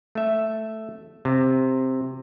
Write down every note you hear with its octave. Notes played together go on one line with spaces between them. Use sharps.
A3 E5
C3